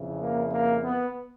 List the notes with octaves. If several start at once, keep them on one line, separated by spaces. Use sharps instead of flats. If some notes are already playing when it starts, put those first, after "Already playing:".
Already playing: F2 C#3 E3
A#3
A#3
B3